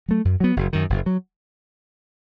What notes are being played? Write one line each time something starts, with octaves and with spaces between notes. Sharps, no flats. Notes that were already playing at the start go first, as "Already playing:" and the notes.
F#3 A3
F#2
F#3 B3
F#1
F#2 D#3
F#1
F#3